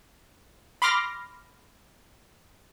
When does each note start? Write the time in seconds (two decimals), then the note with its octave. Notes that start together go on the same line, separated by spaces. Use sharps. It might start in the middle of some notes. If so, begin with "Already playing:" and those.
0.82 B5 C6 D6 F6 A#6